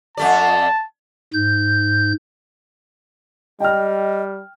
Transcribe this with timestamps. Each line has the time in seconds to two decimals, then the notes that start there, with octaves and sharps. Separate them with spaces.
0.17 F2 A3 D5 A5
1.34 G#2 G6
3.60 G3 D#5 G5 F6